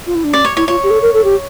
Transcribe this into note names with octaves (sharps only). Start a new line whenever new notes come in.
F4
E4
D4
C#4 D5
C#5
E4 C#5
F4 C#5
G4
A4
A#4
A4
G4